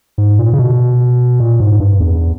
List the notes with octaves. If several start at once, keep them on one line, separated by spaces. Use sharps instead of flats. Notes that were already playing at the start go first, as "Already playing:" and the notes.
G#2
A#2
C#3
B2
A#2
G#2
G2
E2